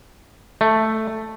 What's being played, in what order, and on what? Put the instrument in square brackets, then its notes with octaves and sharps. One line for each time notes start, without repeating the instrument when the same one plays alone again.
[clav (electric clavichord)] A3